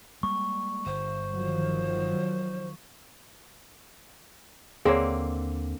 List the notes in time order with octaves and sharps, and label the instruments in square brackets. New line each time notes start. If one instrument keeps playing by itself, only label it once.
[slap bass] G3 G#3 A#3 [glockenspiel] C#6
[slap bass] G1 [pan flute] C5
[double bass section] D#3 F3 F#3
[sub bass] D#2 [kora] D3 A#3 C4 [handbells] G#4 C#5